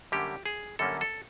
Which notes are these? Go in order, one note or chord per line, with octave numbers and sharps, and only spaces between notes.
F#2 D3 G3 A#3 C#4 G4
G#4
F#2 D3 G3 A#3 C#4 A4
A4